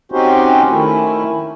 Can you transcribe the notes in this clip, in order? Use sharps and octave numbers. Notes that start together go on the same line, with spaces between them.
C4 C#4 D#4 F#4 G4 C5
D#3 A3 C#4 E4